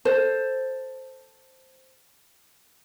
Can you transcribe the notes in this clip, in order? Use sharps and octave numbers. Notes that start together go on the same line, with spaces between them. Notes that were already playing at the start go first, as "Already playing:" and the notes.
A4 C5